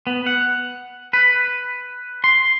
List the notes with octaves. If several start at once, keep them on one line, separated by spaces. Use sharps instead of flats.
B3
F#5
B4
C6